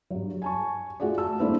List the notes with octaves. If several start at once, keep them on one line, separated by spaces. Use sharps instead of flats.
G2 F#3
G#5 A5 C#6
A3 F4 F#4 G#4 D5
A5 E6
G3 A3 A#3 D4 E4 C5